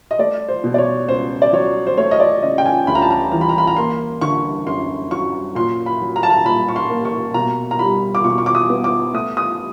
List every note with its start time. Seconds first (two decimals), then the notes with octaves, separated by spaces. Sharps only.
0.11 D#5
0.19 A3 D5
0.48 C5
0.64 B2
0.74 D5
0.78 C#5
1.08 C#2 C5
1.42 D5
1.53 F#3 C#5
1.87 C5
1.97 A3 C#5
2.11 D#5
2.20 D5
2.43 C#3 D#5
2.58 G5
2.66 G#5
2.87 D2 B5
2.95 A#5
3.02 A5
3.10 A#5
3.32 E3 A#5
3.41 B5
3.49 A#5
3.58 B5
3.67 A#5
3.76 A#3 C6
4.21 D3 C#6
4.66 F#2 C6
5.11 F#3 C#6
5.55 A#2 C6
5.86 B5
6.01 F#3
6.16 A#5
6.23 A5
6.30 A#5
6.45 A#2 B5
6.68 C#6
6.76 C6
6.90 A#3
7.05 C#6
7.34 B2 A#5
7.71 A#5
7.79 G3 B5
8.15 D6
8.24 B2 C#6
8.38 C#6
8.46 D6
8.55 D#6
8.70 B3
8.84 D6
9.13 A3 D#6
9.37 D#6